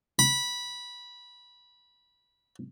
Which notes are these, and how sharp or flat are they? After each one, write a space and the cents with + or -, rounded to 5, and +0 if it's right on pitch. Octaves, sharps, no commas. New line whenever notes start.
B5 -15